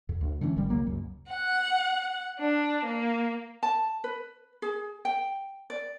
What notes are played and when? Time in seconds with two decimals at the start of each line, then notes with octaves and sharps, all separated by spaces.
0.09 F2
0.21 D2
0.41 D3 E3 G3 C#4
0.57 G#1 D#3 G3
0.70 C#2 F#3 A#3
0.87 C#2 F#2
1.27 F#5
2.39 D4
2.85 A#3
3.63 A5
4.04 B4
4.62 G#4
5.05 G5
5.70 D5